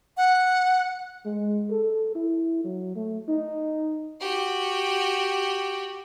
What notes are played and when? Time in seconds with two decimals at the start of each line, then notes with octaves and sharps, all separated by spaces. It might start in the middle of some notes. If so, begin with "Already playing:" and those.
0.17 F#5
1.25 G#3
1.71 A4
2.15 E4
2.64 F#3
2.96 A3
3.28 D#4
4.21 F#4 G4